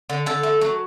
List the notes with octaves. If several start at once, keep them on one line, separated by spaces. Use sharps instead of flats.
D3
D3 A4
A3
F#3